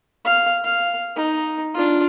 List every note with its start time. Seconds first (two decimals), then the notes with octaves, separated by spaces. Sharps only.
0.25 F5
0.64 F5
1.16 D#4
1.74 D4 F4